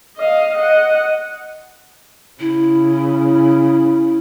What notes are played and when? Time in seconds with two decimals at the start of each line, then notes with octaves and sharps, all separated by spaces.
0.17 D#5 F5
0.55 D#5 F#5
2.40 C#3 E4